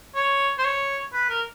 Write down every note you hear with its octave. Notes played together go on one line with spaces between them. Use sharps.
C#5
C5
C#5
B4
A#4